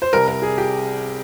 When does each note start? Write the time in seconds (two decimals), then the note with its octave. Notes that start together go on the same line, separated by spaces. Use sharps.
0.02 C5
0.13 C2 C3 G3 A#4
0.28 A#4
0.42 G#4
0.58 G4